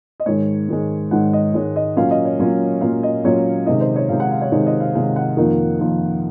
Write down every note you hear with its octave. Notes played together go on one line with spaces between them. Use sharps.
D#5
G#2 D#3 G#3 C#5
G#2 D#3 G#3
G#2 D#3 G#3 F#5
D#5
G#2 D#3 G#3 C#5
D#5
A#2 F#3 A#3 C#4 F4 F5
D#5
C#5
A#2 F#3 A#3 C#4 F4
A#2 F#3 A#3 C#4 F4 F5
D#5
A#2 F#3 A#3 C#4 F4 C#5
C3 D#3 G#3 D#4 D#5
C5
C#5
C3 D#3 G#3 D#4 F5
F#5
F5
C#5
C3 D#3 G#3 D#4 C#5
D#5
F5
C3 D#3 G#3 D#4 F5
F#5
F2 D#3 A#3 F4
F2 D#3 A#3 F4